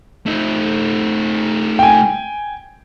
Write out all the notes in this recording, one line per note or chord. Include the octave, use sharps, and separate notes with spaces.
A3 D#4
G5 G#5